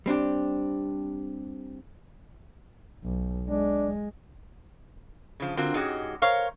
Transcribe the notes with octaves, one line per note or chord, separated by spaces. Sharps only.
G3 C4 D4 G4
B1
G#3 D4
C#3 F3
D3 C4 F4 F#4 A#4
G#2 G#3 C#4 F#4 G4
A#4 C5 C#5 F5